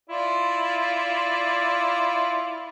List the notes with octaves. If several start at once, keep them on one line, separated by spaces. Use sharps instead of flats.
E4 F4 D5